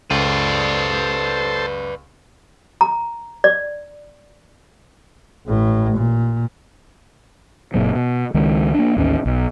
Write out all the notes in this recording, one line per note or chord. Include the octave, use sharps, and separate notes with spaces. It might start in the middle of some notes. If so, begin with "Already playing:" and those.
C#2 A4 B4 C5 D5
A#5
D5
A1 A2
A#2
F#1 A#2 F#3
B2
C#2 D#3 G#3
A#3 D4
A1 D#2 C#4
B1